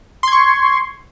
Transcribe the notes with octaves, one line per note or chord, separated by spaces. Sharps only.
C6 C#6 G#6